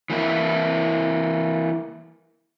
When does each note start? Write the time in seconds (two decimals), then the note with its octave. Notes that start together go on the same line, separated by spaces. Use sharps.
0.10 E3 A#3 E4